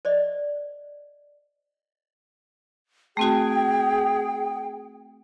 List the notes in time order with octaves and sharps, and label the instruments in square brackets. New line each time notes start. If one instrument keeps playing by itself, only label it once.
[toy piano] C5 D5 D#5
[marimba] A3 C4 F#4 [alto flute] G#4 [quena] G5